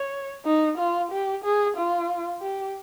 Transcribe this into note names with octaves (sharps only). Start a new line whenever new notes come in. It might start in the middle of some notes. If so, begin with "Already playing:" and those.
Already playing: C#5
D#4
F4
G4
G#4
F4
G4